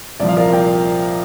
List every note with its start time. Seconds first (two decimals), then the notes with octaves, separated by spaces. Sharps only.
0.20 C2 A#2 F3 D5
0.28 F5
0.37 A#4 D5
0.53 D5 G5